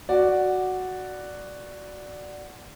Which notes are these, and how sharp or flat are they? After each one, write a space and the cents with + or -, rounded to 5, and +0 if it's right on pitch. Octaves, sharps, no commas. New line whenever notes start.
F#4 +0 D5 +0